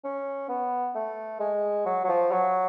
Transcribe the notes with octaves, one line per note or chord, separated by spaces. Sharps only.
C#4
B3
A3
G#3
F#3
F#3
F3
F#3